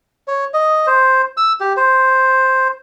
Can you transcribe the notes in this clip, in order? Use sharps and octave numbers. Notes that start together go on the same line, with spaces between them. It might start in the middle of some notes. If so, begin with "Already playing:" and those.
C#5
D#5
C5
E6
G4
C5